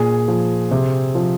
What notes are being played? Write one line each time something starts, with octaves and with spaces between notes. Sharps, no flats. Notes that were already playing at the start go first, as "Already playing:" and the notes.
Already playing: A#2 G#4
F3
C3
F3